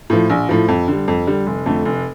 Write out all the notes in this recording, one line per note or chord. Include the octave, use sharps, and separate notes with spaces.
A2 F3
A#1
A2 F3
F2
D3 G3
F2
D3 G3
F1
F2 D3 A3
F1